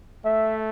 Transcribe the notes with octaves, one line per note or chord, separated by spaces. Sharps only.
A3 E5